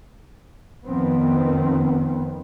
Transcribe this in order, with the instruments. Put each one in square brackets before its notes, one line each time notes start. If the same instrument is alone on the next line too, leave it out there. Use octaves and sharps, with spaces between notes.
[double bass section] F1 D#3 F3 B3 C4